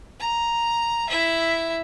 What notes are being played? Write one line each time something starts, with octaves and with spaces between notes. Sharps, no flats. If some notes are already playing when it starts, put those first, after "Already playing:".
A#5
E4 E5